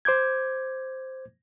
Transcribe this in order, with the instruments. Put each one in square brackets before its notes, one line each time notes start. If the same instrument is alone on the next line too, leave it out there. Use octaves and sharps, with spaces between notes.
[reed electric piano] C5 D6 G6 G#6